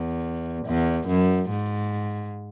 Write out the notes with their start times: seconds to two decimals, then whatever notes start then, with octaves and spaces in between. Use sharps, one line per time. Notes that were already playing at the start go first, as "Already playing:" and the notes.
Already playing: E2
0.66 E2
1.08 F#2
1.50 G#2